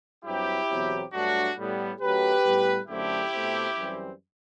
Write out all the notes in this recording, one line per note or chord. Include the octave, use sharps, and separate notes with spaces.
G2 F#3 C4 E4 G4
E2 B2 F#3 C4
G2 F#3 A3 D4 F#4
A2 G3 B3
F#2 F#3 A3 G4 B4
A2 G3 B3
F#2 D3 A3 C4 E4 G4
B2 A3 C4
F#2 E3 G3 C4